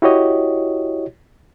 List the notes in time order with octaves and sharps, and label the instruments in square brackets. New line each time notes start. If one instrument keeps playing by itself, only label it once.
[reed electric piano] E4 F#4 G4 C#5 D#5